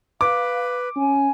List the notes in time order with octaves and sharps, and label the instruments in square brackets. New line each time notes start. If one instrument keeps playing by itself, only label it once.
[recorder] B4 [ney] F5 [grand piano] D6
[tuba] C#4 [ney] G#5